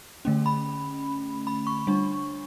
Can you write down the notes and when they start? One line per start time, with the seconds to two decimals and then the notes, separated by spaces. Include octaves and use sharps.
0.25 D3 A3 C#4
0.46 B5
1.47 B5
1.67 C#6
1.87 G3 D4